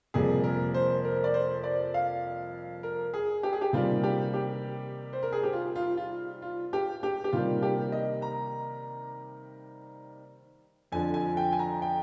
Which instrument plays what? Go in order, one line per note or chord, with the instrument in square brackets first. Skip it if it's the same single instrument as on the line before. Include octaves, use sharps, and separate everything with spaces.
[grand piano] F2 C3 G3 A#3 G#4
A#4
C5
A#4
D5
C5
D5
F5
A#4
G#4
G4
G#4
G4
C3 D#3 G3 A#3 F4
G4
G4
C5
A#4
G#4
G4
F4
F4
F4
F4
G4
G4
G4
C3 D#3 G3 A#3 F4
G4
D#5
A#5
F2 D3 F3 G#5
G#5
G5
G#5
A#5
G5